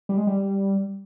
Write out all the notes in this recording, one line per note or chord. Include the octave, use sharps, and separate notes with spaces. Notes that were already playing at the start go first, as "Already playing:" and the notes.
G3
G#3
G3